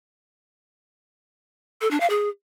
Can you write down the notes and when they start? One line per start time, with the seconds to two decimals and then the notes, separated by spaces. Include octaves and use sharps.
1.81 A4
1.91 D4
2.00 F5
2.10 G#4